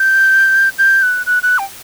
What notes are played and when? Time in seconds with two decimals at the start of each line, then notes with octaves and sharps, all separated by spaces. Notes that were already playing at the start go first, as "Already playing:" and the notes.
Already playing: G6
0.79 G6
1.03 F#6
1.26 F#6
1.43 F#6
1.59 G5